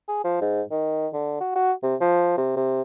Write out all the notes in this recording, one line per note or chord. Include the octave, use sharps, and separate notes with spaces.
G#4
F3
G#2
D#3
D3
F#4
F#4
C3
F3
C3
C3